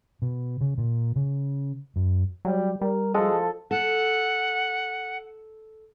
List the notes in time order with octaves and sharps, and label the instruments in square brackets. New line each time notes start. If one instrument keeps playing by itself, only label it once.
[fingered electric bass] B2
C#3
A#2
C#3
F#2
[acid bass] F#3 [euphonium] G3
[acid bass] G3 [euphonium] A#4
[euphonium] F3 [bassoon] G#3 [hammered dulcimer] A4
[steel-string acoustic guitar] A4 [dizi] F#5